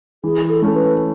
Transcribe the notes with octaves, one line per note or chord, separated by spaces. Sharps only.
E3 G#4
A4
A3 C#4
B4